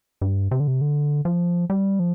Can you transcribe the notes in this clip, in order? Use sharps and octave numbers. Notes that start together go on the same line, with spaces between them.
G2
C3
D3
C3
D3
F3
G3
F3